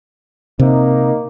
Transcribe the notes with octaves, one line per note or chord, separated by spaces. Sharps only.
C3 A#3 D#4